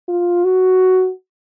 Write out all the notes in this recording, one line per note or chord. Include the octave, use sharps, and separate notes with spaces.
F4
F#4